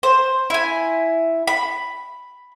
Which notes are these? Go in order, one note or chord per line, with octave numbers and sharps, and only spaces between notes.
C5
E4 G#5
B5